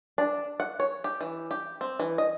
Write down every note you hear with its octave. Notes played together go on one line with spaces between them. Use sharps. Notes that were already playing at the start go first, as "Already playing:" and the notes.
D4
F#5
C#5
G4
E3
G4
C4
E3
D#5